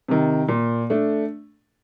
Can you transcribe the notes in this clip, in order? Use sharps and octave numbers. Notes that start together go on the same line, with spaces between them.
C3 D#3
A#2
A3 D4